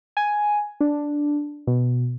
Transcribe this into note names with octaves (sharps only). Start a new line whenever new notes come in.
G#5
D4
B2